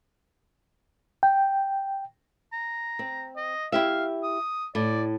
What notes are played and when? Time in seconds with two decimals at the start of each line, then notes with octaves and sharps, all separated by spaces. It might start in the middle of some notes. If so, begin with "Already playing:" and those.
1.23 G5
2.52 A#5
2.99 C4
3.36 D#5
3.72 E4 G4 E5 F5
4.23 D#6
4.75 A2 D5